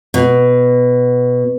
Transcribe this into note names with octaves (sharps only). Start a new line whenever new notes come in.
B2